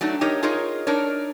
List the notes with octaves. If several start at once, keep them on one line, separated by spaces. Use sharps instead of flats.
F#3 A3 D4 D#4
D#4 G4 A#4 C#5 D#5
D#4 F4 G#4 A#4 C#5 D#5
D4 D#4 A#4 C#5